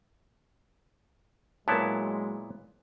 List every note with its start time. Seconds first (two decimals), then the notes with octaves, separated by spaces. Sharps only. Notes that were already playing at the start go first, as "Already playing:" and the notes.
1.68 A#2 F#3 G#3 B3 E4 A#4 C#5 A5